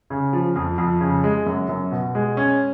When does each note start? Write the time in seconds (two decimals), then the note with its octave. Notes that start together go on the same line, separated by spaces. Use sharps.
0.10 C#3
0.33 F3
0.56 F2
0.78 F2
1.01 C#3
1.24 G#3
1.46 F#2
1.69 F#2
1.92 B2
2.15 G#3
2.37 C#4